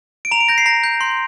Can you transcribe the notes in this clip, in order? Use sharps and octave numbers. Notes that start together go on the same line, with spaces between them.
D7
A#5 F7
D7
G6 A#6
C7
A#5 A#6
G6
C6